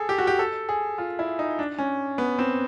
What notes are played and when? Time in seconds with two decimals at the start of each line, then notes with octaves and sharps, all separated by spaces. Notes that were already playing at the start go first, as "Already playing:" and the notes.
Already playing: G#4 A4
0.09 G4
0.18 F#4
0.27 G4
0.39 A4
0.69 G#4
0.98 F4
1.19 E4
1.39 D#4
1.59 D4
1.78 C#4
2.18 B3
2.39 C4